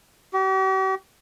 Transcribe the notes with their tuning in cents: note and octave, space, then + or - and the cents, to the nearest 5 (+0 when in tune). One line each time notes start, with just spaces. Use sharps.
G4 -45